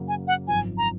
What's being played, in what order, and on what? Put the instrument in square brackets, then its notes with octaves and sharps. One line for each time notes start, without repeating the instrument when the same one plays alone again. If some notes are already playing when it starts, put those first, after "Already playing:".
Already playing: [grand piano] F#2 C#3 F#3 A#3
[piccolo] G#5
F#5
[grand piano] G#1 F#2 F3 [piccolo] G#5
[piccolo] A#5